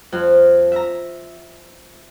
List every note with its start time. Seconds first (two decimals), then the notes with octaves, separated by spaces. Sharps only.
0.12 F2
0.72 E5 A#5